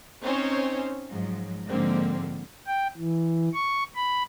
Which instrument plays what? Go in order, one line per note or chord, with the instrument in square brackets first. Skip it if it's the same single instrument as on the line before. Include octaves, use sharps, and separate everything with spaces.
[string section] C4 C#4 D#4 C5 C#5
G#2 F3 F#3
G#2 D3 F3 A#3 C4
[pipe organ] G5
E3
C#6
B5